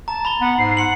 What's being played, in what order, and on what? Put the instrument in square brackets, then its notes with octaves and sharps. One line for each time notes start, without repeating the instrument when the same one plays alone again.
[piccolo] A5 [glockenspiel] A#5
[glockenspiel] B5 A6 G7
[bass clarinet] B3 [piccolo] F#5
[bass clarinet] G#2 [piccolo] C7
[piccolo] F#5 [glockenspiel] C6 C#7 F#7